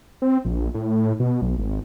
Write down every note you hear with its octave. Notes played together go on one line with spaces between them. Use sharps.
C4
A#1
A2
B2
B1
G#1